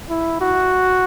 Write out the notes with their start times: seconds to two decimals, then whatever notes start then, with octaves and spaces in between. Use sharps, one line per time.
0.10 E4
0.41 F#4